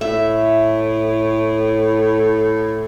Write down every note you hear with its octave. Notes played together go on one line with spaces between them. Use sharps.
A2 E5